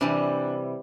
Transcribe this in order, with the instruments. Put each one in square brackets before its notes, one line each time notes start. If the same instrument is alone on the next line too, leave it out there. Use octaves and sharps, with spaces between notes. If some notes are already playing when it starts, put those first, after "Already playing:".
[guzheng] C3 E3 G3 [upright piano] D4